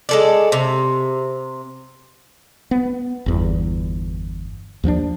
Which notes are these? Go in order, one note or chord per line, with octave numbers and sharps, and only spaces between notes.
G#3 A4 D5
C3
B3
G1 E2
D#2 F3 C4 D4